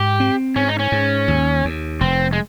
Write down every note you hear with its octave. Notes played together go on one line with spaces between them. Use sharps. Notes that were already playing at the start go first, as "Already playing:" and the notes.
Already playing: G#2 G4
C4
G#2 C#4
D#4
C#4
G#2
D#2
D#2
F1 C4
G#3